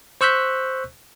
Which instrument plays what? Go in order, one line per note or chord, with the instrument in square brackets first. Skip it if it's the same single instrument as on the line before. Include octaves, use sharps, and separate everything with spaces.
[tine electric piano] C5 C#6 E6 F#6 G6 B6